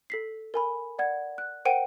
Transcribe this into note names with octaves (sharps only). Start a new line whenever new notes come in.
A4 B6 C7
A#4 G#5 B5
D5 F#5 G#6
F#6
A#4 C5 F#5 G5 D7 D#7